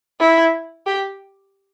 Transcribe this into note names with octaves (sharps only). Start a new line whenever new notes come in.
E4
G4